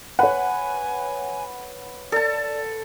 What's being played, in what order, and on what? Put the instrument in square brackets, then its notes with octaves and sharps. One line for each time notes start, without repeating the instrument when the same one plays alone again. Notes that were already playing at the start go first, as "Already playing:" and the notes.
[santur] B4 [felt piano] C#5 F#5 [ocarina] G#5
[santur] A4 A5 [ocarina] D5